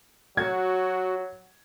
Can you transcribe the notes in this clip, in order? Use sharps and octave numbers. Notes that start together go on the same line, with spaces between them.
F#3 F#4 G#6